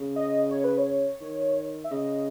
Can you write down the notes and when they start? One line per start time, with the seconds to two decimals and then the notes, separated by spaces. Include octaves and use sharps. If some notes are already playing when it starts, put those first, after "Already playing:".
Already playing: C#3
0.16 D#5
0.51 C#5
0.64 B4
0.78 C#5
1.21 D#3
1.84 E5
1.91 C#3 D#5